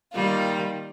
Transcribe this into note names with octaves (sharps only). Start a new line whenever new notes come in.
D#3 G3 A#3 F4